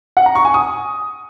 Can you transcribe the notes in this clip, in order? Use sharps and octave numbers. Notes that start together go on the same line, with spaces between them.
F#5
A#5
C#6
G#5
D#6